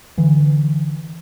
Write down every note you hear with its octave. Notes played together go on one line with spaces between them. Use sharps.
D3 E3